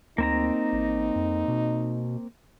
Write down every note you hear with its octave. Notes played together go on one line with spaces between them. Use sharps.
D2 A#3 C4 D#4 A#5
A1
F2
B2